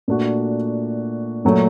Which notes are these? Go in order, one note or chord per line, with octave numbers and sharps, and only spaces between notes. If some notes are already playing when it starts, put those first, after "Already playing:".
A#2 A3 D4 F#4
A#2 F#3 A3